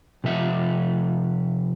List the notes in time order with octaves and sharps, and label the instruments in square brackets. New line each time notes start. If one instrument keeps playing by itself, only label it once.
[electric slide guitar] C3 F3 E5 F#5